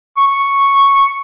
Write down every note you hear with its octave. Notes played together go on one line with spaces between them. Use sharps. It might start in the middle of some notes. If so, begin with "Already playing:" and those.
C#6